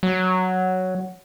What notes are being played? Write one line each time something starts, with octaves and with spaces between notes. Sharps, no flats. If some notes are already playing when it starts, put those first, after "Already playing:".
F#3